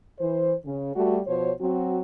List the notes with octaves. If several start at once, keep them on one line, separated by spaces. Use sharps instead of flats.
E3 C5
C#3
G3 A3 F#4
B2 F3 C5 C#5
F#3 C4 F#4